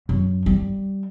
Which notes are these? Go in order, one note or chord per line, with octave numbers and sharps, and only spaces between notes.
F#2
G3